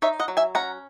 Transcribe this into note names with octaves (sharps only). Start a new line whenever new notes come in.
D#4 C#5 E5
D#5 F#5
F#3
E5 G#5
C#4 F#5 A#5